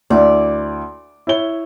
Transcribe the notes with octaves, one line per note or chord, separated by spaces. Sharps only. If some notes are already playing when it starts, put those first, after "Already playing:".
D2 E4 D5
E4 C#5 G7